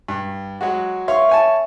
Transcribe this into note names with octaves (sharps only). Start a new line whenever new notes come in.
G2
F#3 G#3 F#4
C#5 E5 F5 C6 C#6
C#5 G#5 A5